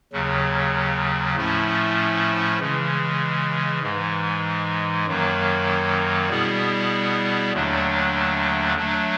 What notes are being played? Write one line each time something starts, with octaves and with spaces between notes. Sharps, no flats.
D#2 C#3 F#3
A2 F3 A3 C#4 E4
C#3 E3 G#3
G#2 E3 G#3
F#2 D#3 F#3 A#3
B2 G3 B3 E4 G#4
D#2 D3 F#3 A3 D4
F#3 A3 D4